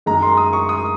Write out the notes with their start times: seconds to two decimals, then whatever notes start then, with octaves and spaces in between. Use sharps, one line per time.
0.06 F#2 D#3 G#3 A#5
0.22 C6
0.37 D#6
0.53 C#6
0.69 D#6